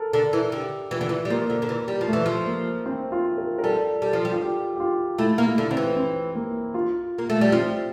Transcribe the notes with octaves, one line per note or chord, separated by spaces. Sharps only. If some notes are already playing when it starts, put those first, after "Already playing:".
Already playing: A4 A#4
D3 A4
E3
D3 G4
E3 F4
D3
E3
G3
F3 A#3
D3
D3
E3
G3
F3
A3
E3
F3
A#3
C4
F4
A#4
A#4
G3 A4
G3 A4
F3
G3
F4
G4
G4
F4
A3 E4
A#3
E4
D3
D3 C4
E3
C4
A#3
F4
A#3
A3
G3
F3 C4